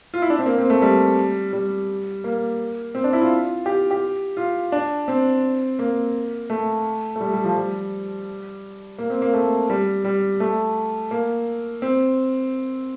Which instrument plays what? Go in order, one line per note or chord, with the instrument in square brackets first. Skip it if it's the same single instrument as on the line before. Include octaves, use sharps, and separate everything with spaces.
[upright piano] F4
E4
D4
C4
A#3
C4
A3
G3
G3
A#3
C4
D4
E4
F4
G4
G4
F4
D4
C4
A#3
A3
A3
G3
G3
F3
G3
A#3
C4
A#3
A3
G3
G3
A3
A#3
C4